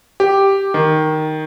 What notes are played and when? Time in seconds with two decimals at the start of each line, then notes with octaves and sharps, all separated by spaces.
0.20 G4
0.74 D#3